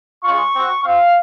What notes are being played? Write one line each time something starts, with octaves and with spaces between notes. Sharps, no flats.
G#3 C#4 F4 C#6
C4 F#4
C4 F4 F5